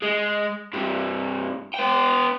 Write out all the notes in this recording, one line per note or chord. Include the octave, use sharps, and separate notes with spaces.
G#3
G2 C3
B3 G5